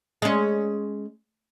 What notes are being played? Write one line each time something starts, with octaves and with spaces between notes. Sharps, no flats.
G#3 C#4